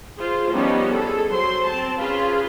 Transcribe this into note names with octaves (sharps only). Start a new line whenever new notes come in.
F4 G#4 C5
F3 G3 B3 C#4 D#4
G#4 A4
F#3 C5 C6
C4 A5
C#4 F4 G#4 B4